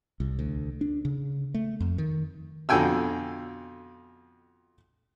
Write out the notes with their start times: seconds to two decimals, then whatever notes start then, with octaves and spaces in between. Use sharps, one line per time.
0.20 C2
0.39 D2
0.81 D4
1.05 C#3
1.54 A3
1.80 F2
1.98 D#3
2.69 F2 B2 D3 G5 G#5 E6